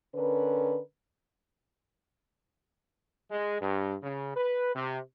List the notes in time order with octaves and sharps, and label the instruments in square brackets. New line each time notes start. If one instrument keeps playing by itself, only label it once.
[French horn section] D3 C#4 A#4 B4
[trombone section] G#3
G2
C#3
B4
C3